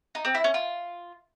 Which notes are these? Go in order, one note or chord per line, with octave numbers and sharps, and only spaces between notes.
D#4
C4
E4
C#4
F4